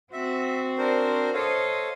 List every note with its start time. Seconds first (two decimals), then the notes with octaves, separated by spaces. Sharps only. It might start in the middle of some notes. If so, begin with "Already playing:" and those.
0.13 C4 F#4 E5
0.78 D4 A#4 C5
1.34 A4 C5 C#5 D#5 F5